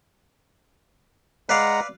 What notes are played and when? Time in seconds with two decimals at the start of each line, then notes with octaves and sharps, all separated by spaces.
1.49 G#3 B4 D5 F5 F#5 A#5